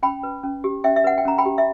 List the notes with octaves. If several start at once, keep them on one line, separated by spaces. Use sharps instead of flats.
C#4 G5 B5
B4
C#4
G4
C#4 E5 G5
E5
B4 F#5
G5
C#4 A#5
G5 B5
G4
E5